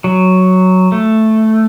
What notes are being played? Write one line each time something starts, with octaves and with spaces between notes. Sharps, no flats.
F#3
A3